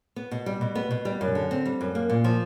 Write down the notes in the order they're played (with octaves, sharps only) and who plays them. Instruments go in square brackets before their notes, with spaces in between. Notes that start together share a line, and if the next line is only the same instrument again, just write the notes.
[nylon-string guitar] B3
B2
G3
B2
B3
B2
G3
F#2
D3
C4
G3
F#2
A#3
A#2
F3